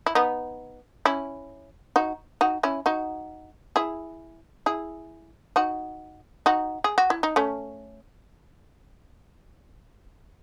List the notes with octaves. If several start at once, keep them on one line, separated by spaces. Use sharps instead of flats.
E4
B3 D#4
C#4 E4
D#4 F#4
D#4 F#4
C#4 E4
D#4 F#4
E4 G#4
E4 G#4
D#4 F#4
D#4 F#4
G#4
F#4
E4
D#4
A3 C#4